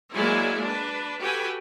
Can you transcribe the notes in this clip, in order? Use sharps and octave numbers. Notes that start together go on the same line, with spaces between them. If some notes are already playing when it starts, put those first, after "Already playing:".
F#3 G#3 A#3 E4 D5 G#5
D4 B4
F#4 G4 A4 B4 G5 G#5